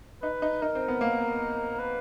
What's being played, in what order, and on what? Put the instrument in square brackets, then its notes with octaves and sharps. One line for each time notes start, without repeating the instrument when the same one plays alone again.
[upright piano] D#4 [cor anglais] B4
[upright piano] D#4
[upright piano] D#4 [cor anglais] A#4
[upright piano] C4
B3
A#3
[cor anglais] B4